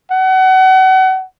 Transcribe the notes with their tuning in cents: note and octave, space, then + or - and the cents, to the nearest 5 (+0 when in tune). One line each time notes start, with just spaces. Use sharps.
F#5 +30